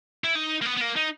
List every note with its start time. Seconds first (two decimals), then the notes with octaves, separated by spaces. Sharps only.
0.24 E4
0.35 D#4
0.61 A#3
0.65 B3
0.76 B3
0.81 A#3
0.96 D#4